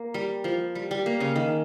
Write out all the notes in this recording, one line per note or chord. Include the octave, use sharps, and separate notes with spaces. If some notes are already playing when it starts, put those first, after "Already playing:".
Already playing: A#3
G3
F3
G3
G3
A#3
C#3 C#4
D#3